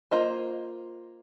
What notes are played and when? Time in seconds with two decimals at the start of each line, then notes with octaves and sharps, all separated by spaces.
0.11 A#3 F4 C5 D#5